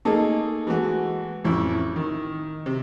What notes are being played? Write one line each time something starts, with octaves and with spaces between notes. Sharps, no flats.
A3 A#3 D#4 G#4 A4
E3 G#3 A3 F#4
A1 F2 E4
D#3
C3